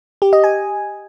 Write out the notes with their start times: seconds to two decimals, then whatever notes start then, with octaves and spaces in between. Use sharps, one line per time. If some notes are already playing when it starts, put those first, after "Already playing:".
0.22 G4
0.33 D#5
0.44 G#5